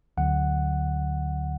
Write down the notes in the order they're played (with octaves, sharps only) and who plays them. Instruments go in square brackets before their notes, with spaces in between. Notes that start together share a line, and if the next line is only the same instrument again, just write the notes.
[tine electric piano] D2 D3 F#3 F#5